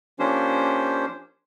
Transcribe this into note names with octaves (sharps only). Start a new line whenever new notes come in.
F3 A#3 C#4 D4 G4 C5